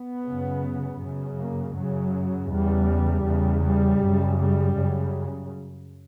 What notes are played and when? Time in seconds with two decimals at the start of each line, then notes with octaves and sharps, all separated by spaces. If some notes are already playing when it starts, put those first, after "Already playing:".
Already playing: B3
0.23 F#2 C#3
0.99 F#2 C#3
1.36 A#3
1.74 F#2 C#3 F#3
2.50 E2 C#3 G3
3.25 E2 C#3
3.63 G3
4.01 F#2 C#3
4.39 G3
4.76 F#2 C#3